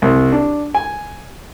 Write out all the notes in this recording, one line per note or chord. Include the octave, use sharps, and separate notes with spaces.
C2
D4
G#5